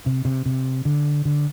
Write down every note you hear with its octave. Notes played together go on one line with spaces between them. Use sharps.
C3
C3
C3
D3
D3